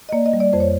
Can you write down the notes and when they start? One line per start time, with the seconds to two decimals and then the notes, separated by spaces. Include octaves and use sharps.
0.09 D#5
0.13 A#3 D5
0.26 D#5
0.33 G3
0.40 D5
0.53 F2 C5
0.60 C#5